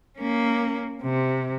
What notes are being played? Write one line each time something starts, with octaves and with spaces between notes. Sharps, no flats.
A#3 C#4
C3